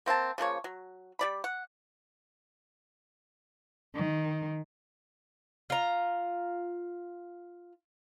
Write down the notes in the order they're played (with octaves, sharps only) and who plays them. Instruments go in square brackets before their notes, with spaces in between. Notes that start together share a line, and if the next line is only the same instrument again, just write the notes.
[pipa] A#3 C4 E5 A5
C#3 F3 A#3 C#5
F#3
G3 D5 B5
F#5
[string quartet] D#3
[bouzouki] F4 A#5